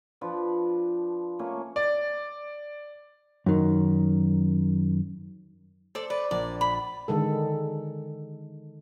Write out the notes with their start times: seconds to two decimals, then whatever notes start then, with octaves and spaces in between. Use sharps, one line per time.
0.21 F3 D4 B4
1.39 A3 A#3 C#4 C#5
1.76 D5
3.46 F#2 D#3
5.95 A4 C5 D5
6.10 B4 D5
6.31 A#1 D5
6.61 B5
7.08 D3 D#3 G#3 A4